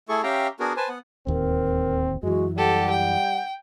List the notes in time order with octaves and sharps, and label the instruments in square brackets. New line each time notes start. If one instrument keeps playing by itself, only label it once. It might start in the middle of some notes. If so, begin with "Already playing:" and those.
[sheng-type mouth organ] A3 E4 G#4 A4 C#6
C#4 G4 E5 F5 G5 A#5
B3 D4 F#4 G#4 A#4
B4 C5 G#5 A5
B3 F#5
[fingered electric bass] D1 D#2 [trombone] C4 [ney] A#4
[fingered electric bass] F#2 E3 [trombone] G#3 [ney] F#4
[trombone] G3 [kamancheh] G4 A4 [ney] F#5
[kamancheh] G5